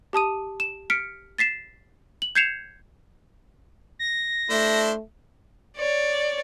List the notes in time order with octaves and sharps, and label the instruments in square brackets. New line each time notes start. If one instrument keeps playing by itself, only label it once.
[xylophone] G4 A5 D#6 D#7
E7
F6 B6 C#7 D7
A6 B6 C7 E7
F#7
G6 G#6 C7 C#7 E7 F7
[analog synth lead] A#6
[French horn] A3 [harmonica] D4 E4 C5
[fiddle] C#5 D5